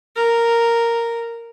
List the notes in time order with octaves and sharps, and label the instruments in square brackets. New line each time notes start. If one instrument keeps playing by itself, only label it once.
[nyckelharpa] A#4